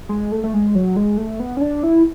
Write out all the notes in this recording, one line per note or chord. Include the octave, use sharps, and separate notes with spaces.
G#3
A3
A3
G#3
F#3
G#3
A3
B3
C#4
D4
E4